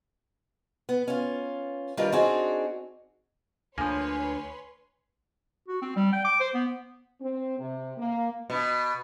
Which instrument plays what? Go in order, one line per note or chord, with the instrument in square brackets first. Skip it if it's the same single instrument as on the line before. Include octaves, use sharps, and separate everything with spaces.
[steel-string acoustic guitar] B3
C#4 F4
D#3 G3 D4 F4 A#4 B4
C4 D4 D#4 F#4 G#4 D5
[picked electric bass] D2 D3 [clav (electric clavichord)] F3 A#3 [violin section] B4 C#5 C6 [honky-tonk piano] G#5
[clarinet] F#4
C4
G3
G5
D6
C5
B3
[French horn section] C4
C3
A#3
[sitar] B2